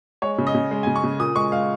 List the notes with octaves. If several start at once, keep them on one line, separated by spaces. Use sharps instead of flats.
G#3 C#5
C#3
D#5
C#3
G#3
G#5
C#3
C#6
C#3
A#2 D#6
G#3 C#6
G#3 F5